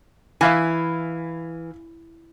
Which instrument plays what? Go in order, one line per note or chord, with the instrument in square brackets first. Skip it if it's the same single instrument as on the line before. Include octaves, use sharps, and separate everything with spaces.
[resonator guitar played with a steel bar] E3 [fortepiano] E5 F5 G#5